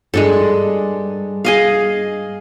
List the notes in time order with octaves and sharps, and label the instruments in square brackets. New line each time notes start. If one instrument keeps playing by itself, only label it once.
[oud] G2 [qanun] G#3 D4 A4
[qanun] G#4 D#5 F5